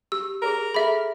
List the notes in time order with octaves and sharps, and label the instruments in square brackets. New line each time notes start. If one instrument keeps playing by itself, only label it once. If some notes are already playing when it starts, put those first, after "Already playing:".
[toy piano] G4 [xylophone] E6
[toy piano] G#4 C#5 A#5 [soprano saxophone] A#4
[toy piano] G#4 A4 [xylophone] E5 B5